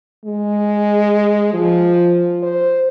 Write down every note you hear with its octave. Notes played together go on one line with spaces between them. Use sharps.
G#3
F3
C5